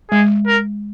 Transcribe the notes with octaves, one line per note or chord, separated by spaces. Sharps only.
G#3 G#4
A#4